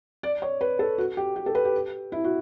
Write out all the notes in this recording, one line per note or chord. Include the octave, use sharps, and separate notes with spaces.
D5
C#5
B4
A4
F#4
G4
G4
A4
B4
G4
E4
F#4